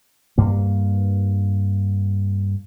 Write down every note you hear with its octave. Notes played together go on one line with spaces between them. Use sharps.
G2 A#3